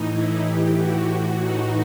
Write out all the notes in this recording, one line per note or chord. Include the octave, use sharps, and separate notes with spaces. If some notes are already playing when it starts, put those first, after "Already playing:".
Already playing: A2 E3 D#4
E4
A2 E3 G4
F#4
A2 E3 F#4
D#4